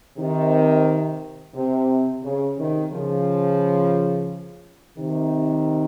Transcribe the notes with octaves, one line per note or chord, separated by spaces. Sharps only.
C3 D#3
C3
C#3
C3 D#3
C#3 F3
C3 D#3